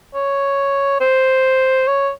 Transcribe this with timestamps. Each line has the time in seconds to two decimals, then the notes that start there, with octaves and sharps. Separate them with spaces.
0.15 C#5
1.01 C5
1.87 C#5